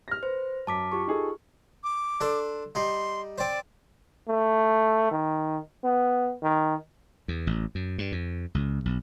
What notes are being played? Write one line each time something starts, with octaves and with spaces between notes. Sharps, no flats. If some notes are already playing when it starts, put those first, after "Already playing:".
F6 A#6
B4 C5
F#2 A5 D6 B6
F4 G4 C#6
D#4 G#4 A4
D6
D4 A4 C5
G3 D#4 C6
C4 C5 D5
A3
D#3
B3
D#3
E2
A1
F#2
G2
F2
C#2
B1